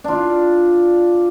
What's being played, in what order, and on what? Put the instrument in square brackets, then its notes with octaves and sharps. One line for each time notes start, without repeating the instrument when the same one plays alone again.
[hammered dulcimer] D4 F4